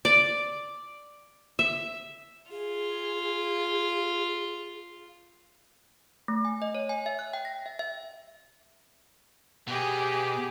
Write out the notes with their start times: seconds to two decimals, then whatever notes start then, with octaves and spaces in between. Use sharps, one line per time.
0.05 D5
1.59 E5
2.51 F4 G#4
6.28 A3
6.45 G#5
6.62 D#5
6.75 C#5
6.89 G#5
7.06 E5
7.19 F#6
7.33 G5
7.45 A#6
7.66 E5
7.79 E5
9.67 B2 G4 G#4